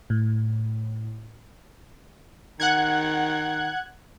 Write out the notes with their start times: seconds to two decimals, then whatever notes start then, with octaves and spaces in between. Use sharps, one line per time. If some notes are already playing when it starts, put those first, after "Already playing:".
0.10 A2
2.60 D#3 F#5 F#6 G#6